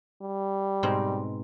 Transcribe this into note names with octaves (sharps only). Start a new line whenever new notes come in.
G3
G#2 B2 C4